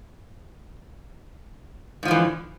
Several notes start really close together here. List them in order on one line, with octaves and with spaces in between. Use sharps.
G#2 F3 D3 E3